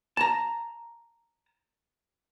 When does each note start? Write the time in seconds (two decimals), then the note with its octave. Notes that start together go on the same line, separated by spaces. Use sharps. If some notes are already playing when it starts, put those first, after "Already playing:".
0.17 A5 A#5